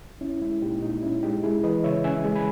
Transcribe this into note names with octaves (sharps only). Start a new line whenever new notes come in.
C#4 E4
G#3 E4
A#2 D#4 G4
A#2 D#4
C#4 E4
G#3 D#4 G4
G#3 E4 G#4
E3 B4 D#5
C#3 C#5 E5
C#4 E5 G#5
G#3
G#5 B5